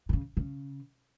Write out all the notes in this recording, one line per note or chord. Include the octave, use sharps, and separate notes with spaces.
B2
C#3
C#3